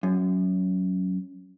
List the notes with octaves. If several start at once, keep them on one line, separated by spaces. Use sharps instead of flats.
F#2